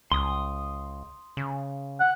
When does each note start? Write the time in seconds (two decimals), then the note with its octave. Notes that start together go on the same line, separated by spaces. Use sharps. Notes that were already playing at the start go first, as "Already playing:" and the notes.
0.12 C#2 C6 D#6
1.37 C#3
2.00 F#5